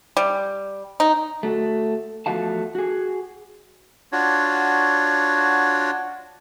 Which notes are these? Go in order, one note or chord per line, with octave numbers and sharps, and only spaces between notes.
G3
D#4
A3 F#4
E2 F3 A3 F#4 F5 A5
F#4 G#4
D4 F4 F#4 C#5